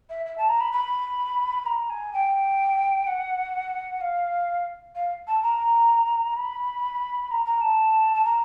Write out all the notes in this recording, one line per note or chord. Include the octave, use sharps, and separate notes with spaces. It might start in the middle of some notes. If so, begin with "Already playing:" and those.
E5
E5
A5
A#5
B5
B5
A#5
G#5
G5
F#5
F5
F5
A5
A#5
B5
A#5
A#5
A5
A5
A#5